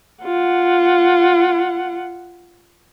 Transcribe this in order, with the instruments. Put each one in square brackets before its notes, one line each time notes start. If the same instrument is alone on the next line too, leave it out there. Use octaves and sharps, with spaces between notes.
[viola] F4 F#5